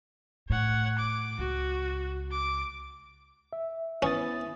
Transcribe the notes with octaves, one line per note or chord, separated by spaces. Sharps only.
A2 C#5 F#5
D6
C#2 F#4
D6
E5
B3 C#4 E4 D#6 A6